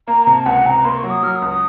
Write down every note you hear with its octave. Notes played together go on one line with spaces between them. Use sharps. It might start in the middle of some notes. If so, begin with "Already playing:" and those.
A#3 A#5
A#5
C3
A5
C#2 F#5
C3 A#5
A#3 C6
C#6
F#3
D#6
F#3 F6
D#6
C#2
D#6